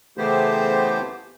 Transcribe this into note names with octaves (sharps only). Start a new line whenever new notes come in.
C#3 E3 A3 B3 G4 C5